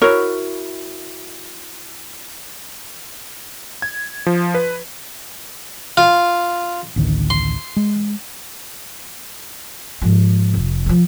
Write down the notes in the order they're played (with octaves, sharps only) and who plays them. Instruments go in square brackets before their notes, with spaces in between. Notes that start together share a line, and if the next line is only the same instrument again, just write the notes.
[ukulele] E4 F#4 A#4 C#5
[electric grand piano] G#6
F3
B4
[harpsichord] F4
[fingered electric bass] A1 D2 D#3
[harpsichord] C6
[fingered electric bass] G#3
[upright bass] G#2 F3
F1
D#3 F3